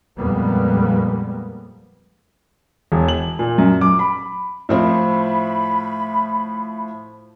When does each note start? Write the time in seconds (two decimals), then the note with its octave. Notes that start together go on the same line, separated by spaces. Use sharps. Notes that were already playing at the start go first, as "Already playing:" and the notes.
0.19 F2 A#2 G3 G#3 A#3 B3
2.92 E1
3.08 F#7
3.39 A#2
3.58 F#2
3.81 D6
3.99 B5
4.69 A2 F3 C4 B5